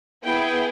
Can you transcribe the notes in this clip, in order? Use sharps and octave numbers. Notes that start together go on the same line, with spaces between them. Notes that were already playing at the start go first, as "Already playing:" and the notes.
B3 E4 G#4 G5